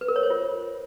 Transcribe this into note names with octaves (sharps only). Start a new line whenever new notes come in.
B4
A#4
C#5
C5
F4